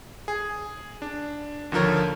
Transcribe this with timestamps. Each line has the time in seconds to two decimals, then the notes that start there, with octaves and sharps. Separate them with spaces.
0.28 G#4
1.02 D4
1.72 D#2 D3 F3 A#4 C#5